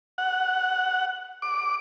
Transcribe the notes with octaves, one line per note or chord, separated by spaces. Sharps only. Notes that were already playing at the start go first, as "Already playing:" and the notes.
F#5
D6